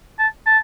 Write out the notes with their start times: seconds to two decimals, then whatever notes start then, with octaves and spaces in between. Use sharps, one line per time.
0.19 A5
0.46 A5